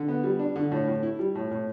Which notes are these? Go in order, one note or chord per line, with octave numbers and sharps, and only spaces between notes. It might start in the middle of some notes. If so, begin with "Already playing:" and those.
Already playing: D3
B3
G3
D4
D3
A2
A2
E4
G3
A2
A2